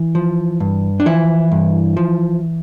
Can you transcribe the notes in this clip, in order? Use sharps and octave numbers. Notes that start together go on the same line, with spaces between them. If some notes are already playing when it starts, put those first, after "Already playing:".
Already playing: E3
F3
G2
D4
E3 F3 E4
G2
F3